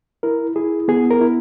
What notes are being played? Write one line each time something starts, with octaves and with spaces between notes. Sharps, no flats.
E4 A#4
E4 G#4
B3 G#4
A#4
E4